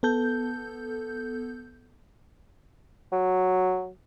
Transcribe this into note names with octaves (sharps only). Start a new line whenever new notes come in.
B3 A4 G6
F#3